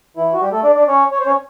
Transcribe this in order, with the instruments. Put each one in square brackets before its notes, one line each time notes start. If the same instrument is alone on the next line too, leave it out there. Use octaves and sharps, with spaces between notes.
[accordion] E3 E4
F#4
G3 G4
A3 A4
D4 D5
D4 D5
C#4 C#5
C#5
C5
C#4 C#5